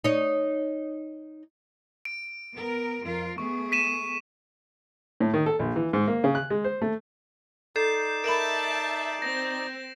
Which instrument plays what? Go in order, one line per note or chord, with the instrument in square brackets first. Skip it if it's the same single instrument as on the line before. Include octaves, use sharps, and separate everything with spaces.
[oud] D#4 C#5
[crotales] D7
[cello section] B3 A#4
F2 F4 A#4
[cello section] A3 B3 G#4 [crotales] C#6
[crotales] B6 D#7 E7
[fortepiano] A2
D#3
A4
A#1
E3
G#2
A#3
C#3
F#6
G#3
C5
A3
[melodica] D#4 D5 [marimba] A4 [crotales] G6 C7 E7
[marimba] A#4 B5 [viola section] E5 A5 [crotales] D7 E7 F#7
[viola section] C4 [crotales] A#6